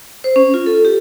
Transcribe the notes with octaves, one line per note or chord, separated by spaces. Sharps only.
C5
C#4
F4
A4
G4